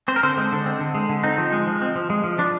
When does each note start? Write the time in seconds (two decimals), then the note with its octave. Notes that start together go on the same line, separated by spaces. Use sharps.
0.08 C4 C5
0.16 A#4
0.23 D3 C4 C5
0.38 G#3
0.52 D3
0.66 C4
0.80 D3
0.95 G#3
1.09 D3
1.23 C4 D#4
1.38 F3
1.52 G#3
1.67 F3
1.82 C4
1.96 F3
2.10 G#3
2.24 F3
2.38 F3 D4